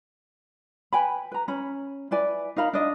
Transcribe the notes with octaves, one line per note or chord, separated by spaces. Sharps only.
B4 G5 G#5 B5
B4 A#5
C#4 B5
E4 B4 D5 G#5
D#4 A#4 F5 B5
D4 D#5